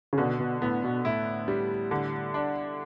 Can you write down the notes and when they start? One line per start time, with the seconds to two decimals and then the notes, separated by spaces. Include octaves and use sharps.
0.13 C#3
0.18 B2 D3
0.40 B2
0.62 A2 B3
0.84 B2
1.05 A2 E4
1.48 G3
1.91 D3
2.34 D4